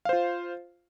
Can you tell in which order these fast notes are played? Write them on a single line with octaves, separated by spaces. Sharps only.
F5 C5 F4